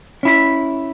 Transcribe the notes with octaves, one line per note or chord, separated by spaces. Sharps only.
C#4 E4 B5